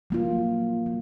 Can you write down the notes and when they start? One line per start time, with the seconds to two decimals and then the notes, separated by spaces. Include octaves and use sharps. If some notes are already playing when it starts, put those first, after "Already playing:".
0.10 F#3 A#3 F4
0.86 F#3